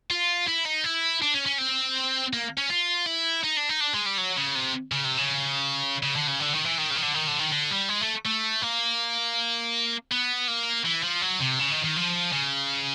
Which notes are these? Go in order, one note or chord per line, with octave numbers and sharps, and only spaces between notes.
F4
E4
D#4
E4
D4
C#4
C#4
C4
A#3
C#4
F4
E4
D#4
D4
D#4
D4
G#3
G3
F#3
C#3
C3
C#3
C3
C#3
C#3
D3
C#3
D3
D#3
E3
D#3
C#3
D#3
D3
D#3
D3
D#3
D3
G3
G#3
A3
A3
A#3
B3
A#3
E3
F3
F#3
C3
C#3
D#3
D#3
F3
C#3